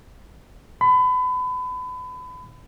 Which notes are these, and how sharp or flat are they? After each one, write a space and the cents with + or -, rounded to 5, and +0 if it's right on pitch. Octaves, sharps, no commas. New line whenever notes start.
B5 +30